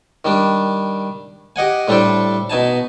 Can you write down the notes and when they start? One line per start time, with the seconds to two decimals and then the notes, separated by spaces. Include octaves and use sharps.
0.25 D#3 G3 D4
1.56 G4 D#5 F#5 G#5
1.88 A2 G3 D4 A4 C5 G5
2.50 B2 D#4 G#5 A5